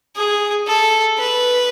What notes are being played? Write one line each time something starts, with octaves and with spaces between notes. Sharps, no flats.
G#4
A4
B4